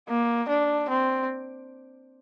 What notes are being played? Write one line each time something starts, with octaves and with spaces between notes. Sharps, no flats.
A#3
D4
C4